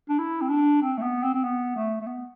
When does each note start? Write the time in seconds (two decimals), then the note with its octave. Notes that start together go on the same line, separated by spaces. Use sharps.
0.09 D4
0.18 E4
0.41 C4
0.49 D4
0.82 C4
0.98 A3
1.02 B3
1.23 C4
1.34 C4
1.44 B3
1.76 A3
2.00 A3
2.07 B3